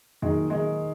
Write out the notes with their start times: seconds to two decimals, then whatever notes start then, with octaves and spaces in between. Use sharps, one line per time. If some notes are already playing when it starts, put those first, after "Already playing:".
0.22 A#2 D#3 F#3 G#3 D#4
0.50 D#3 G#3